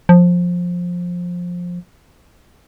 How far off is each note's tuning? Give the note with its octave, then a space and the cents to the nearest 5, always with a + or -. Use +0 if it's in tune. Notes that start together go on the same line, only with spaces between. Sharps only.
F3 +15